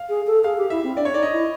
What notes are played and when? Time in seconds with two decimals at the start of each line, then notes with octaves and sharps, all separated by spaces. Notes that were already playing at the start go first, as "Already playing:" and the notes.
Already playing: F5
0.09 G#4
0.27 A4
0.44 G#4 F5
0.57 G4
0.70 E4 E5
0.83 C4
0.97 D4 D5
1.05 C#5
1.14 D#4 D5
1.23 D#5
1.32 E4